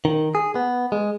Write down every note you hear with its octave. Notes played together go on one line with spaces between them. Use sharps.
D#3
G#4
B3
G#3